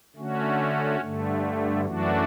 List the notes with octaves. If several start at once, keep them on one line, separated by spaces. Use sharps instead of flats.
D3 A3 C#4 F#4
G2 D3 A3
F#2 E3 A3 D4 F#4